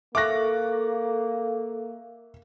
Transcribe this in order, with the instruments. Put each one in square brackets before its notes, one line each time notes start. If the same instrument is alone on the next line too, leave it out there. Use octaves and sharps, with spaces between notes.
[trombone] A#3 [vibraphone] A4 F5 [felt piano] E5 C#6 F#6 [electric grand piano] D6 A#6